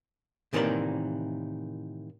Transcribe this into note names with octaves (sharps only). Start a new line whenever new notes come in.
A2 C3 D#3 E3 A#3 D5